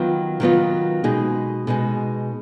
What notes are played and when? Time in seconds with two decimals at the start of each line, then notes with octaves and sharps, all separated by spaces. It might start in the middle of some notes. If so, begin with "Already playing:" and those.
Already playing: D#3 F#3 B3 F4
0.40 D#3 F#3 B3 F4
1.04 B2 G#3 D#4 G#4
1.67 B2 G#3 D#4 G#4